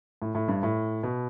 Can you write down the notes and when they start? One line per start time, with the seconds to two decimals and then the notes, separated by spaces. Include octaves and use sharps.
0.22 A2
0.35 A2
0.48 G2
0.63 A2
1.03 B2